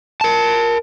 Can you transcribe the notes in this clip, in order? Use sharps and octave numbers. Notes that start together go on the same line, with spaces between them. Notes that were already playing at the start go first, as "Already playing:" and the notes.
A#4 A5